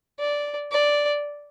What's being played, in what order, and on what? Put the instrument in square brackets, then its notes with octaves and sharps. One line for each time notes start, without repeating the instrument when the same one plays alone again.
[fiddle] D5
D5